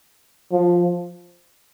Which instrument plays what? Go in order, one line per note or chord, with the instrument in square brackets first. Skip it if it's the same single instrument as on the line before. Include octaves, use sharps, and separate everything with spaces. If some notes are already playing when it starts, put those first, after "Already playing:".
[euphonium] F3